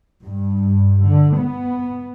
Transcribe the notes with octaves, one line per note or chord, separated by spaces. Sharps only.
G2
D3
B3